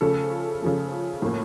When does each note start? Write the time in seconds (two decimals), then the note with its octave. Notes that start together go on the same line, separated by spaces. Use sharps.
0.01 C#3 F3 A3 A4
0.62 C#3 F3 A3
1.22 A2 F3 A#3